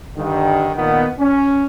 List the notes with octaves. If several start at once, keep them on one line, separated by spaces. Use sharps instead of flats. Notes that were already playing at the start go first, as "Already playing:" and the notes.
G2 D3 D#3
A#2 D#3 B3
C#4